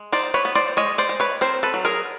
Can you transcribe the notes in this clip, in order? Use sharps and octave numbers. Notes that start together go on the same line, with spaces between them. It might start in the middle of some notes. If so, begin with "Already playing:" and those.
Already playing: G#3
D#4 C5 D5
B4 C#5
B3
C5 D5
G#3 C#5 D#5
C5 D5
G#3
B4 C#5
C4 A#4 C5
A4 B4
F#3
G#4 A#4